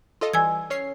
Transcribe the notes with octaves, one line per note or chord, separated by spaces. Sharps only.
F4 A4 D#5
E3 G3 G#5 E6 G#6
C#4 C#5 C7